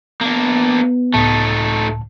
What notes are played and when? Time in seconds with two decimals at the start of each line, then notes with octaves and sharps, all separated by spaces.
0.21 A#3 B3 D4
1.14 C#2 A2 A3 D#4 A5